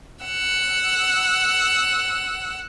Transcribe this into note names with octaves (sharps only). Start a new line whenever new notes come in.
F#5 E6